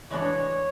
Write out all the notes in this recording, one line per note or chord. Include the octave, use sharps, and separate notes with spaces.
E3 G#3 B3 D4 F#4 C#5